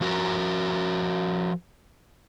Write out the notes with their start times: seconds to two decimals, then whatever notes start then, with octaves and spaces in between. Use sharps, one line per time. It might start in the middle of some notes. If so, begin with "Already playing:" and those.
0.01 F3 F#4 A#4 A#5